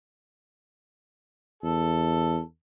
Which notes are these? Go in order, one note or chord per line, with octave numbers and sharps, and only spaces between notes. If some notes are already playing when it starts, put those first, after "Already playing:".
E2 A4